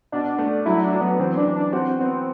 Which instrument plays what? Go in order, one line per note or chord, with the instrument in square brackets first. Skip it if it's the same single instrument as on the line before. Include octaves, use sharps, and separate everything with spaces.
[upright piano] B2 [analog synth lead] D4
[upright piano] A3
[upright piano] F#3 [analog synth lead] E4
[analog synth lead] D4
[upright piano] F#3
[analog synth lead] B3
[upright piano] E3 [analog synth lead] C4
[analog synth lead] D4
[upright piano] E3
[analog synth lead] D4
[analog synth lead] C4 [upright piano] F#4
[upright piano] B3 [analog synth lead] C4